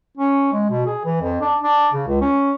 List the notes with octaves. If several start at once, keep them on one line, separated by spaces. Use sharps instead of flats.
C#4
G#3
B2
G#4
E3
F2
D4
D4
C#3
C#2
C#4